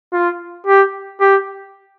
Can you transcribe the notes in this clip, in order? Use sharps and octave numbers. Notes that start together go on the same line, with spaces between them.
F4
G4
G4